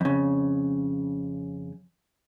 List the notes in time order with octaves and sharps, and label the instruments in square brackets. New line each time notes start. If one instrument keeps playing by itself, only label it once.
[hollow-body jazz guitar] F2 C#3